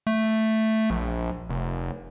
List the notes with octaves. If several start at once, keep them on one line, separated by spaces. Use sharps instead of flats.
A3
A#1
F1